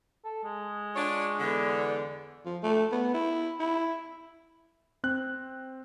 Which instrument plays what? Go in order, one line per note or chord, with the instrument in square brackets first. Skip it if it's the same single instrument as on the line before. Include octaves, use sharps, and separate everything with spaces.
[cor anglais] A4
G#3
[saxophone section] D4 F4 C#5
E2 D3
[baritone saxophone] F3
A3
B3
E4
E4
[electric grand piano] C4 F#6